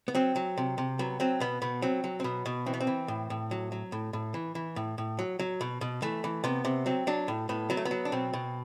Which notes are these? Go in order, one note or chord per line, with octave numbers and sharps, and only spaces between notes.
B3
F#3 C4
F#3
C3
C3
F#3 B3
F#3 C4
B2 B3
B2 B3
F#3 C4
F#3
C4
B2 B3
B2
E3 C4
B3
C4
E3
A2
A2
F#3
F#3
A2
A2
E3
E3
A2
A2
F#3
F#3
B2
B2
E3 A3
E3
C3 B3
C3
F#3 C4
F#3 D4
A2
A2 B3
F#3 B3
A3
B3
F#3
D4
B2 C4
B2